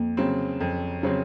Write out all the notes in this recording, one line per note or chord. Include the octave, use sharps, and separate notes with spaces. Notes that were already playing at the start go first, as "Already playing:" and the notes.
Already playing: F2 A#3
C#3 F#3 C4
F2
C#3 F#3 C4